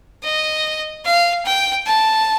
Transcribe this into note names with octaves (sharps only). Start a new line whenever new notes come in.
D#5
F5
G5
A5